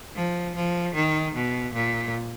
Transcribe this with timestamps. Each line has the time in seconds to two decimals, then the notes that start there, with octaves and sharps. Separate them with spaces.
0.15 F3
0.55 F3
0.95 D#3
1.34 B2
1.74 A#2